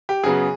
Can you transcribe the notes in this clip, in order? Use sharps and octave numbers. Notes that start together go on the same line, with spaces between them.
G4
F#2 C#3 F#3 B3 G#4